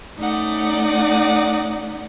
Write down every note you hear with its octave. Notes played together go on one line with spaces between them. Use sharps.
A3 C#4 D#4 D5 F#5